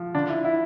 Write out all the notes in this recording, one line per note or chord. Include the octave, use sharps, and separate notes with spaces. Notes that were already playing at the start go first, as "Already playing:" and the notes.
Already playing: F3
D3 D4
E4
E4